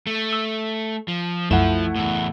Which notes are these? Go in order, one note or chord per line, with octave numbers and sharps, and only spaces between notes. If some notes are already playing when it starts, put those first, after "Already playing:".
A3
E6
F3
C2 F#2 F3 A3 E4 F#5 E7
E2 A2